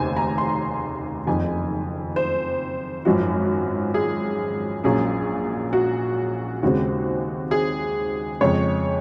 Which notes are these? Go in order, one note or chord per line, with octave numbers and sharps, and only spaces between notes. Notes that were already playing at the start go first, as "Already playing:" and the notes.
Already playing: F1 D#2 C#3 C5 G#5
A#5
C6
F#1 F2 D#3 G#5
C5
G#1 F#2 F3 F#4
G#4
A#1 A#2 F#3 A#3 C#4 G#4
F#4
D#2 C#3 G#3 C4 F#4
G#4
F2 C#3 G#3 C#5